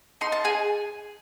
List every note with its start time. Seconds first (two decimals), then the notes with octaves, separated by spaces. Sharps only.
0.21 D#4 C6
0.32 A5
0.44 G#4 G#5